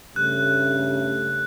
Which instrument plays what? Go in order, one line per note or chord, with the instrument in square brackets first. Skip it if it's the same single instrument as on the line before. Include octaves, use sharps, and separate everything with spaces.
[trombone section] G2 C#3 A3 [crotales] F#6